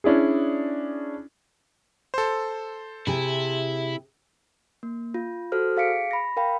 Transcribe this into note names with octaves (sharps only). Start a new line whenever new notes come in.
C#4 D4 E4 G#4
A4 C5
C3 E4 G#4
A#3
F4
F#4 A4 C5 F6
G#4 F5 B6 C#7 D7
B5 A#6
A#4 F5 G5 B5